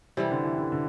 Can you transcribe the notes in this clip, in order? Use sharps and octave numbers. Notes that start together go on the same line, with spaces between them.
C3 E3 G3 E4 A4
D3
E3
D3
D3